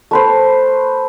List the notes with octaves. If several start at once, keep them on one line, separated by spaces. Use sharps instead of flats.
A3 B4 C5